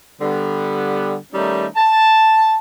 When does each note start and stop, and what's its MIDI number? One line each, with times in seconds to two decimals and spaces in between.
0.21 1.16 50
0.21 1.16 55
0.21 1.16 59
1.33 1.67 51
1.33 1.67 55
1.33 1.67 57
1.33 1.67 61
1.33 1.67 63
1.76 2.57 81